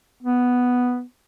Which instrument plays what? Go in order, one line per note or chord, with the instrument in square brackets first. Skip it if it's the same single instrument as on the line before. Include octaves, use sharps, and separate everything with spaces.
[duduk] B3